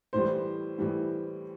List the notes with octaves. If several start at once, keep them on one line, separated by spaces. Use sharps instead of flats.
A2 E3 G3 C5
A2 E3 G3